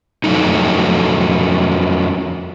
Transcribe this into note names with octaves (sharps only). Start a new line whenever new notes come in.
F2 F#3 G3 A3 D#4